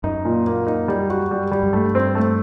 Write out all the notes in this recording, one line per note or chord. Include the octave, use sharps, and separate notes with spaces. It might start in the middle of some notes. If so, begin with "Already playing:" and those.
F#2 D#4
A#2
A#3
D#4
G3
F#4
G3
G3
F#2
G2 A3
C4
A3